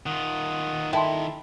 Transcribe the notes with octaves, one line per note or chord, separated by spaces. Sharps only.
D#3 F4 F#5 D#6
E4 A4 G5 A5 C6